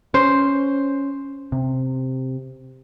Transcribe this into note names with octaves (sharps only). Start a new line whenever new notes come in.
C#4 C5
C3